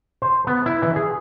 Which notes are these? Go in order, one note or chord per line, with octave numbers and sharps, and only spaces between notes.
C5
B3
E4
E3
G#4